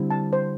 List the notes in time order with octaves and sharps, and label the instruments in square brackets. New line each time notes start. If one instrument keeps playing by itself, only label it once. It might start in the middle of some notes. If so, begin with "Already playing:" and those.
Already playing: [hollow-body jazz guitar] D3 G3 C4 E4
[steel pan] A5
C5